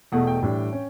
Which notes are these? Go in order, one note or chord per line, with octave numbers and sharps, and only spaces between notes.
E2 B2 A3 F#5
G5
A2 E3 G3 D4
C#4